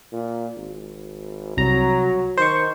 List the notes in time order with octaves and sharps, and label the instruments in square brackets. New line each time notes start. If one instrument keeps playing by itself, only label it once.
[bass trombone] A#2
G#1
[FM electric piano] C2 A#5 [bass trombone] F#3
[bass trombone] D#3 [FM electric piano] C5 C#6